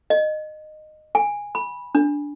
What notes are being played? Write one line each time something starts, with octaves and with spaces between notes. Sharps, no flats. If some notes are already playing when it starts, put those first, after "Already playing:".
D#5
G#5
B5
D4